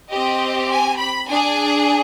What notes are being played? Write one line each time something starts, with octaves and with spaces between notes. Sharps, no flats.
C4 G4 D#5
G#5
B5
D4 G#4 G#5